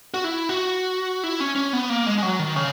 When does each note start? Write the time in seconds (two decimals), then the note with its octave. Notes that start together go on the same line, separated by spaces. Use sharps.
0.14 F#4
0.24 E4
0.49 F#4
1.24 E4
1.40 C#4
1.56 C#4
1.73 B3
1.90 A#3
2.07 G#3
2.18 G#3
2.23 F#3
2.39 D#3
2.56 C#3